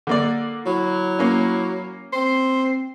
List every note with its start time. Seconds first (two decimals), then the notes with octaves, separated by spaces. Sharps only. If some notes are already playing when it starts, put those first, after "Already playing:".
0.07 D3 A#3 D5
0.66 F#3 E4
1.19 A#3 C#4
2.13 C4 C5